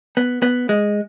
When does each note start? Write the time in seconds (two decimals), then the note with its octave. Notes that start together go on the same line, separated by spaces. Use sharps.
0.17 B3
0.42 B3
0.69 G#3